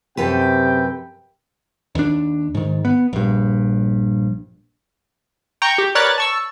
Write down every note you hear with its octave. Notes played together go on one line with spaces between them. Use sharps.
F#2 C3 A4 B4 G5
D#2 D4
G#2 D#3
B3
A#1 G2
G5 A#5 C#6
G4
A#4 B4 C#5 D5 F#6 A6
A5 C#6 E6